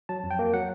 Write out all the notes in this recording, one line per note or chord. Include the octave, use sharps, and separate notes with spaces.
F#3 A5
F2
G5
A#3
F#3 F#5